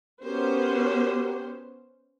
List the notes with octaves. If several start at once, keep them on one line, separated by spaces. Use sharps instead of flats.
B3 C#4 F#4 G4 A#4 C5